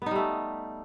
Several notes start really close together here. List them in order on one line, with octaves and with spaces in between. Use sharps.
B3 D#4 G3 A3